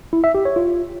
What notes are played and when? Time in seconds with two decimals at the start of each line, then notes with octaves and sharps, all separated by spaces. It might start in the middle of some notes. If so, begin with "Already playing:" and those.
0.13 E4
0.24 E5
0.35 G4
0.45 C#5
0.56 F4